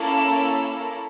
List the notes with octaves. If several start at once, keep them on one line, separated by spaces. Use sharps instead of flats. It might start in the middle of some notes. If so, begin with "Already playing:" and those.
Already playing: A#3 C#4 E4 A4
E6